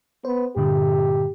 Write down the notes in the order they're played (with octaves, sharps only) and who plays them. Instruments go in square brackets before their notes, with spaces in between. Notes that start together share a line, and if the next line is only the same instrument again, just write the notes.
[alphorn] B3 [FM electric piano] C5
[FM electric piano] G2 A#2 D3 [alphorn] G4